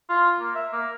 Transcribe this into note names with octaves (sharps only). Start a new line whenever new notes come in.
F4
A#3
E5
A#3